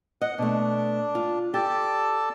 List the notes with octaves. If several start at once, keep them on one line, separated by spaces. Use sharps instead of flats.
D#5 F#5
B2 A3 D4
F4
G4 A4 D5 A5